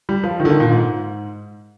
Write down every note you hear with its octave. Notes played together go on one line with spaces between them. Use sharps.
G3
F3
D#3
D3
D#3
A#2
G#2